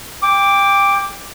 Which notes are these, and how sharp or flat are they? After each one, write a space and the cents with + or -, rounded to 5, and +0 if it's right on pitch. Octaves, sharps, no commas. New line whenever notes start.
G5 +25 D6 +0